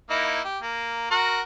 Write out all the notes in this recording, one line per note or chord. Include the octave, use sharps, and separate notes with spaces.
A#3 D#4 E4
G4
A#3
F#4 A#4 F#5